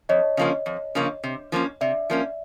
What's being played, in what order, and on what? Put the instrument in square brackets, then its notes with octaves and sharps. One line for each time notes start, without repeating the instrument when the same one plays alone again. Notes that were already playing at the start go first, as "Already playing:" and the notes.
[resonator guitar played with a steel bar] F2 [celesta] C#5 D#5
[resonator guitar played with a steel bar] C#3 F3 A#3 C#4
F2
C#3 F3 A#3 C#4
C3
F3 A#3 C#4
[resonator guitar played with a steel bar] C3 [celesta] D5 E5
[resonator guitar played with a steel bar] F3 A#3 C#4